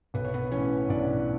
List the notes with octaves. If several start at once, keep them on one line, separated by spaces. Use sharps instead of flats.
B1 B4
C#5
B3 B4
A2 E3 C#4 C#5
B1 D4 D5